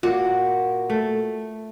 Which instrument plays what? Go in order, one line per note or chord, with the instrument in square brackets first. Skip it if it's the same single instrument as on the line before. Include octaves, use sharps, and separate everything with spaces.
[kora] A#2 A#3 [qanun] F#4
[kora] A3